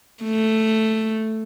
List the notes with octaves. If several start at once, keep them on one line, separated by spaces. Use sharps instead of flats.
A3